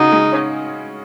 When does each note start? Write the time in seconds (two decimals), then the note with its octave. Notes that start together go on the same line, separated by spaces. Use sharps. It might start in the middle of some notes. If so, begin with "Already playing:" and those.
Already playing: C#3 D#4 F#4
0.12 G#3
0.32 C#4